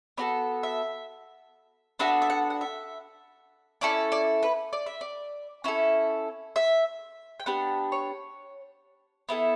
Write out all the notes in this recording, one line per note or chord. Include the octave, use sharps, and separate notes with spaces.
B3 F#4 A4 D5
E5
B3 D4 F#4 A4 E5
E5
F#5
F#5
E5
C#4 E4 A4 D5
D5
B4
D5
E5
D5
C#4 E4 A4
E5
G5
B3 D4 G4 F#5
C#5
B3 E4 A4